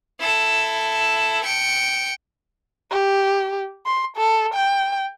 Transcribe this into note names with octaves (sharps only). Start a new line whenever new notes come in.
E4 A4
G5 C#7
G4
C6
A4
G5